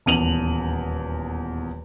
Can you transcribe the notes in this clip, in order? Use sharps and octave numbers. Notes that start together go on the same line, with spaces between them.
D#1 E2 D#7 F7 F#7